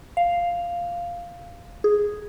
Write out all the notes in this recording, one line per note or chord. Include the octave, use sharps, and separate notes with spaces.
F5
G#4